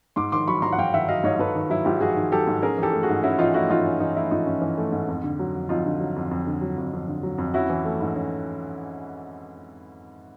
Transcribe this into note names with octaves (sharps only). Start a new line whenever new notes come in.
G#2 C6 D6
D#3 C6 D6
F#3 B5 C#6
G#2 A#5 C6
F#5
G#2 F5 G5
D#3 E5 F#5
F#3 D#5 F5
G#2 C#5 D#5
G#2 A4 B4
D#3
F#3 E4
G#2 F4 G4
G#2 F#4 G#4
D#3
F#3 G4 A4
G#2
C#4 G#4 A#4
E3 G4 A4
A3
F#4 G#4
G#2
C#4 E4 F#4
E3 D#4 F4
A3 E4 F#4
G#2 D#4 F4
C#4
E3 D#4
A3 E4
G#2 D#4 F4
C#4
E3
A3
G#2
F2
D3
F#3
F2
F2 D#4 F4
D3
F#3
F2
F2
D3
F#3
F2
F2
D3
F#3
F2
C#4 E4 F#4
E3
A3
G#2
C#4